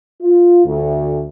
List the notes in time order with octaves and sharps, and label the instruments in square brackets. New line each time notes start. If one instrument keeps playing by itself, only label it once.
[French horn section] F4
D2